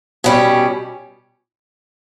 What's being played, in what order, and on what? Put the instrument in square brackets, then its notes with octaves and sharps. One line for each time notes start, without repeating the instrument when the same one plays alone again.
[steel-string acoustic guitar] B2 G3 C#4